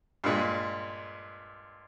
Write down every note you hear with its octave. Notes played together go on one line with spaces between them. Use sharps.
G2 A#2 G#3